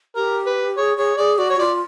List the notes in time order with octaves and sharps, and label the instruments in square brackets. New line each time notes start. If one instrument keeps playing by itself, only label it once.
[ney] G4 [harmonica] A#4
[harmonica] B4
[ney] G#4 [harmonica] C#5
[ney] G#4 [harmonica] C#5
[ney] G#4 [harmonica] D5
[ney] F#4 [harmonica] D5
[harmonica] C#5
[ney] F4 [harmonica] D5